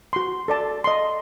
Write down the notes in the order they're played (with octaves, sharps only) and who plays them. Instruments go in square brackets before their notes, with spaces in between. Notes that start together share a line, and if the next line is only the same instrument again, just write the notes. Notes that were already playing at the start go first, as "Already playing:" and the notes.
[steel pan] F#4 C6
A4 D5 A5
D#5 C6